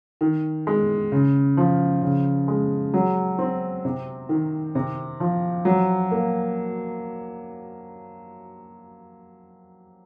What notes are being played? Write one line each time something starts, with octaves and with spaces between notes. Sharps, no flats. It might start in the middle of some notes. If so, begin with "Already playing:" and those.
D#3
G#3
C#3
F3
C#3
G#3
F#3
C4
C3
D#3
C3
F3
F#3
A#3